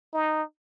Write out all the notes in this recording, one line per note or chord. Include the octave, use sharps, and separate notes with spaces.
D#4